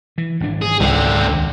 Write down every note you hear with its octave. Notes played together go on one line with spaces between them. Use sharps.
E3
G#1 E3 D4
G#4
C#2 D3 C4
D#2